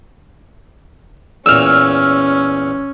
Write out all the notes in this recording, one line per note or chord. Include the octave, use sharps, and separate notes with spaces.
E2 A#2 C#4 E6 F6